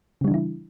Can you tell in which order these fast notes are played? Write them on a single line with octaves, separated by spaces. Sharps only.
C#3 G3 D4 E3 E4